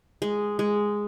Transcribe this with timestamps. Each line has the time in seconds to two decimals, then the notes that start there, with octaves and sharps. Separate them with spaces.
0.22 G#3
0.59 G#3